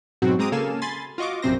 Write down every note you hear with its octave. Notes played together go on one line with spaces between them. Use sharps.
G#2 B2 F#3 C4 F#4
G#3 C4 A#5 D6 D#6
C#3 A#3 A4 F5 G#5 E7
G#5 B5 C6 A6
F4 F#4 D#5 C#6 D6
A#1 F#2 C3 C4 C5 A#6